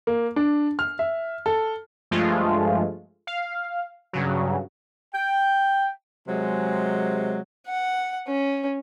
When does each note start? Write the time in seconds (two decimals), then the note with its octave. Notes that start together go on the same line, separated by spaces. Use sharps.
0.07 A#3
0.36 D4
0.79 F6
0.99 E5
1.46 A4
2.11 G2 F3 G#3 A3 F4
3.27 F5
4.13 G2 C#3 F#3
5.14 G5
6.28 C3 F#3 G#3
7.67 F#5
8.28 C#4